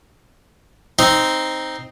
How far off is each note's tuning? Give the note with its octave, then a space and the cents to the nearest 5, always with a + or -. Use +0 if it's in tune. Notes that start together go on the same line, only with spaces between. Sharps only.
C4 +0 D#4 +0